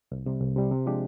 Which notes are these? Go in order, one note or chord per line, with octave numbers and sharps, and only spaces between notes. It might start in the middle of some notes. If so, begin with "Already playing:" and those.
C2
C3 G3
C2
C3 G3
C3
F3 G#3 D4 G4